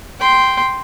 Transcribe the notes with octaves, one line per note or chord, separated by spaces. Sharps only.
G5 C6